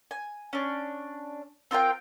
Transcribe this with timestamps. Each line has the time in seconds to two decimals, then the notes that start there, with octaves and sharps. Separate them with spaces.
0.11 G#5
0.53 C#4 D4
1.71 C4 F4 A#4 G5